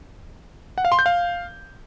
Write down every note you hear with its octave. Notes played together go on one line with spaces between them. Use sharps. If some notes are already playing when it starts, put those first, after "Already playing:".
F#5
F5
C6
G6
F5